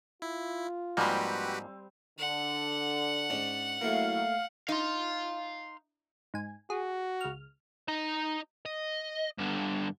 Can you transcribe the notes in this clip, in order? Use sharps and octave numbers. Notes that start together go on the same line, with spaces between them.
E4 F4
G#2 F3 G3 A#3 C4 F#4 G4 B4
D3 F#5
G#2 C#4 D4
F#3 A3 A#3 E4 F5
D#4 F5 C6
G#2 G#5
F#4 G#4
C#2 F6
D#4 A#5
D#5
G2 D3